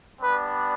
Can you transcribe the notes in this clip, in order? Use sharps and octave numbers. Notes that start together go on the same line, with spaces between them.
G3 B3 D4 B4